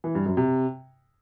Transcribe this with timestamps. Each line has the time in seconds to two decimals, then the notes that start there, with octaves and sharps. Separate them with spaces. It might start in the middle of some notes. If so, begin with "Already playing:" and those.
0.04 E3
0.15 G2
0.26 F#2
0.37 C3